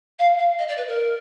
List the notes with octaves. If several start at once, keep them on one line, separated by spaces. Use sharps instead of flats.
F5
F5
D#5
D5
B4
A#4